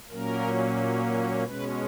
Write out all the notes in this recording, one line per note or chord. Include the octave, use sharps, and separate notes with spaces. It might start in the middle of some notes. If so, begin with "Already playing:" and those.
A#2 F#3 A#3 C#4 A#4
B2 G#3 C#4 B4